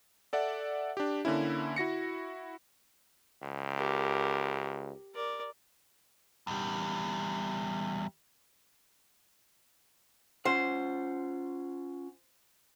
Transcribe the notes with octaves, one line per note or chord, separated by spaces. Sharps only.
A4 D5 E5 F#5
D4 G4
D3 A#3 C#4 E4
E4 F#4 A#6 C#7
C#2
G4 A#4
A#4 D5
E2 G3
C#4 F4 C5 F#5